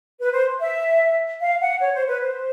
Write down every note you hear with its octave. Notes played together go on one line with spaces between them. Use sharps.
B4
C5
E5
F5
F#5
C#5
C5
B4
C5